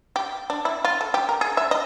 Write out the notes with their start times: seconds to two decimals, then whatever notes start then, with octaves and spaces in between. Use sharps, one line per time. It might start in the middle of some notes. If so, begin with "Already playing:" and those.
0.16 G4
0.50 D4
0.65 E4
0.85 F4
1.01 A4
1.14 G4
1.29 A#4
1.41 G#4
1.57 E5
1.71 D#5